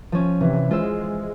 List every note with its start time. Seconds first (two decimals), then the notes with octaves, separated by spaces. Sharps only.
0.12 F3 C#4
0.41 C3 E3
0.71 G#3 F4 C5 E6